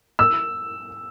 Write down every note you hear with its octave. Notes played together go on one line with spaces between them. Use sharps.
E6